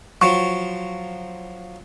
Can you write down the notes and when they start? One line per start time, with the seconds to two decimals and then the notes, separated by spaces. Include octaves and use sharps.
0.21 F3 F#3 C#6